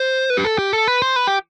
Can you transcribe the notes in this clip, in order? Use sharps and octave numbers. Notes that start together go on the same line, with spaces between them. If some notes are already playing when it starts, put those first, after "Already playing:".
Already playing: C5
B4
G4
A4
G4
A4
B4
C5
B4
G4